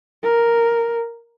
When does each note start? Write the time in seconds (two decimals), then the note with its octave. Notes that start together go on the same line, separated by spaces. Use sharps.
0.23 A#4